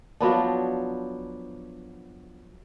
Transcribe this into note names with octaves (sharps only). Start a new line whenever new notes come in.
F3 F#3 B3 D4